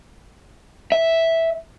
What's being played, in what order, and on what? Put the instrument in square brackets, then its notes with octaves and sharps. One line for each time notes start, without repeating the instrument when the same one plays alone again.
[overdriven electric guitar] E5